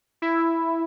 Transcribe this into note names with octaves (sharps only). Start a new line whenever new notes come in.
E4